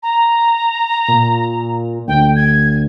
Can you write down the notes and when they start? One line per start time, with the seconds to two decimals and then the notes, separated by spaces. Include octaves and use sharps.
0.02 A#5
1.08 A#2
2.08 D2 G5
2.36 G#6